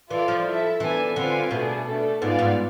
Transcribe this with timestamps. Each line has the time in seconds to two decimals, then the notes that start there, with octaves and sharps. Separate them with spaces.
0.10 E3 F4 A4 D5
0.28 F3
0.46 E4 A4 E5
0.80 E3 B3 D4 A4 E5 G#5
1.16 D3 C4 F4 B4 F5 G#5
1.51 B2 A3 D4 G#4
1.85 A3 D4 A4
2.21 G#2 B3 F4 G#4 D5 F5
2.39 G#2